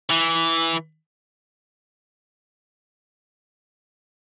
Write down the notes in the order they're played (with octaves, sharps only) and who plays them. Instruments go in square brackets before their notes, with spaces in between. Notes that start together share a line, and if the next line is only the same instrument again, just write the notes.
[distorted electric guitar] E3